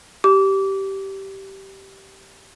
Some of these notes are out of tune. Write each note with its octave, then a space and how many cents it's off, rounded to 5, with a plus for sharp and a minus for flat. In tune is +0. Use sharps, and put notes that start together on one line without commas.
G4 -15 D6 -25